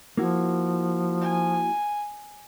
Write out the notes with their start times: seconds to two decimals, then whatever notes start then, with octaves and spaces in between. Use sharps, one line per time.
0.17 F3 A#3 E4 F#4
1.21 G#5